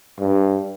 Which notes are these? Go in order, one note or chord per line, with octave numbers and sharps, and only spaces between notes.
G2